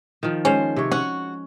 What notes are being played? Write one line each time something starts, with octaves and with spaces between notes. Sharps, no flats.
D#3 F3
G#3 C#4 C5
C3 C#5
C#4 F#4